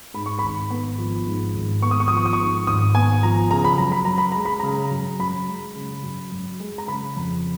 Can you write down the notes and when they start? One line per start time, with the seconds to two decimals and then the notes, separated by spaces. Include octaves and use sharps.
0.14 G#2 B5
0.26 C#6
0.39 G#1 B5
0.70 B3
0.98 F3
1.27 G#2
1.55 G#1
1.82 B3 C#6
1.91 D#6
2.00 C#6
2.08 F3 D#6
2.17 C#6
2.26 D#6
2.33 C#6
2.39 G#2
2.67 G#1 D#6
2.95 B3 G#5
3.23 F3 A#5
3.51 C#3 A#5
3.64 B5
3.78 F#2 A#5
3.92 B5
4.05 F#2 A#5
4.18 B5
4.32 G#3 A#5
4.45 B5
4.59 C#3 A#5
4.91 F#2
5.19 F#2 B5
5.48 G#3
5.76 C#3
6.03 F#2
6.32 F#2
6.60 G#3
6.78 A#5
6.87 C#3 B5
7.16 F2